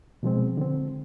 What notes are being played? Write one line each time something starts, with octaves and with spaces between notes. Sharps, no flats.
B2 F3 G#3 C4
D3 C4